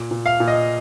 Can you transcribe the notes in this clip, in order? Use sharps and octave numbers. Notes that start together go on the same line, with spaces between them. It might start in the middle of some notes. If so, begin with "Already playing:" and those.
Already playing: A#2
A#2
F5
A#2
D#5